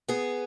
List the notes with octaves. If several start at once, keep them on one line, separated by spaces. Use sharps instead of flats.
B3 G#4